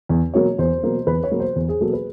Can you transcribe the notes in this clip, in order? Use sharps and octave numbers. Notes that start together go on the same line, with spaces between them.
E2
B2 F#3 A#3 C#5
E2 C5
B2 F#3 A#3
E2 B4
C#5
B2 F#3 A#3
C5
E2
G#4
B2 F#3 A#3 A4
B4